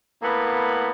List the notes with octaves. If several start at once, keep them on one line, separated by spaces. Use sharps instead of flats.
A2 A#3 B3 F#5